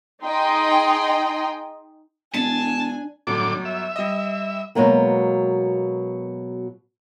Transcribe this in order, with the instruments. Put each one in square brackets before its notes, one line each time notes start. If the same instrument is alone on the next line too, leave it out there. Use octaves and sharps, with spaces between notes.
[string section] D#4 G#4 D#5 G5 C6
[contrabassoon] E1 [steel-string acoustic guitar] D4 [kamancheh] G#5 [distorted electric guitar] A5
[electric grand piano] G1 F#3 [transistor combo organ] A2 D3 D6
[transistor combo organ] E5
[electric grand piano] G3 D#5
[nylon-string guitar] B2 F#3 G#3 A#3 B3